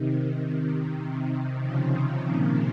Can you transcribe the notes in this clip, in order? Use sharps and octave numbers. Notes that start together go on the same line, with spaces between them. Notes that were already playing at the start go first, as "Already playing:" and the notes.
Already playing: C3 D#3
C3
C3
C3 D#3
C#3 F3
C#3
A#2